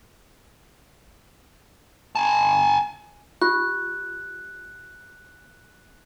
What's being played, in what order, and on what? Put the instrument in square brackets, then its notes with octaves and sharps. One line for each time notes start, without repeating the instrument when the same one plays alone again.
[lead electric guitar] G#5 A5
[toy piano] F4 G4 [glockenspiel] F#6